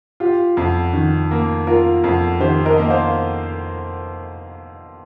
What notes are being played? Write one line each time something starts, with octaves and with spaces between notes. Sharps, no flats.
F4 G4
F2
D#3
A#3
F4 A#4
F2
D#3 G4 C5
A#4 D#5
A#3 D#5
C5 F5